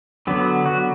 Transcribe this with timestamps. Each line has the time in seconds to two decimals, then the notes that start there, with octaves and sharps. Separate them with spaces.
0.27 D3 F#3 B3
0.66 F#4